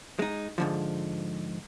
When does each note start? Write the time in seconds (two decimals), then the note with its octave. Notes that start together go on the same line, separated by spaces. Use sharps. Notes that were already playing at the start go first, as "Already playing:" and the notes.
0.19 G#3 D#4
0.58 G#2 D3 F3